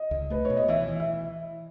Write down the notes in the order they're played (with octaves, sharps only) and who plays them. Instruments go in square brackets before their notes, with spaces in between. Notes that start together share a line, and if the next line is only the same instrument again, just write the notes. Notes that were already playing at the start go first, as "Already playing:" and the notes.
Already playing: [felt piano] D#5
[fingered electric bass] C#2
[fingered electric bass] A3 [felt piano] B4
[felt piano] C#5
[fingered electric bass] B2
[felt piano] D#5
[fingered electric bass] E3 [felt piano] E5
[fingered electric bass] E3
[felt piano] E5